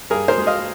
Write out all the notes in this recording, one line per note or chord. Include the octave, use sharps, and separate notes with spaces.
G2 G#4 A#4
A#4 C5
G#3
D#5 F5